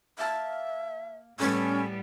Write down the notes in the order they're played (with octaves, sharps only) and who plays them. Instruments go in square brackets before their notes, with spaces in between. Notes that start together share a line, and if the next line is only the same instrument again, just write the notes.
[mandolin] A#3 F5 A5 [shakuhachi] E5
[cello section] A2 G3 B3 [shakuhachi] C#4 [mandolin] A4 G#5 B5